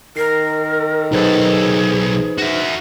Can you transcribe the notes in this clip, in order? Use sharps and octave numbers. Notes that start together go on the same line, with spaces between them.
D#3 A#4 C7
B1 D#4 G#4 A4 B4 C5
F#4 E5